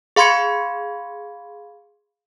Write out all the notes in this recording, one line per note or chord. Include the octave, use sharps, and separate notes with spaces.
G#4 F5 B5 C6 G#6 C#7